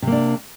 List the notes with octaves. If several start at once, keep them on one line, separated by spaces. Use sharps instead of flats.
C3 A#3 D4